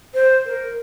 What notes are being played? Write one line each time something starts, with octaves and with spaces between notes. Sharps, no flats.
C5
A#4